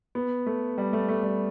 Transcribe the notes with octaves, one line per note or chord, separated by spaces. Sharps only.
B3
A3
G3
A3
A3
G3